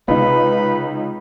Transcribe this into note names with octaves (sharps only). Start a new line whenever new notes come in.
C#2 C3 D#4 B4